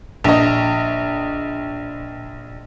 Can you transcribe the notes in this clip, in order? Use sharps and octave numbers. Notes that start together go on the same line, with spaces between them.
A#1 D#5